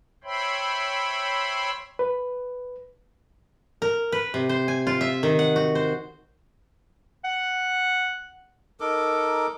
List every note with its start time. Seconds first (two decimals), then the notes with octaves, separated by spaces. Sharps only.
0.24 C5 C#5 E5 G5 B5 C6
1.99 B4
3.82 A#4
4.12 B4
4.34 C3
4.49 C5
4.68 G#5
4.87 F4
5.01 E5
5.23 D#3
5.39 F#5
5.56 F#4
5.75 C5
7.24 F#5
8.80 D#4 A4 A#4 D6